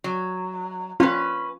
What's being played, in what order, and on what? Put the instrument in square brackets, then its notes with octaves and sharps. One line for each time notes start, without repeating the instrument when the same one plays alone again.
[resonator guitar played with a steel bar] F#3
[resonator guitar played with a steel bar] C#4 B4 [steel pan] F4